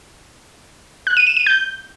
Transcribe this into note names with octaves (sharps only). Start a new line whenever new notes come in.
F#6
D#7
E7
D#7
G6